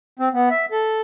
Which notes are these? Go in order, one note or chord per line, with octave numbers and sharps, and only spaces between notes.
C4
B3
E5
A4